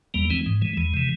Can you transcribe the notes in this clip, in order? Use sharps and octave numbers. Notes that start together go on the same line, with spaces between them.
E2 G3 A#3
E3 G#3 C4
G#2
E3 G#3
E2 G#3
C3 E3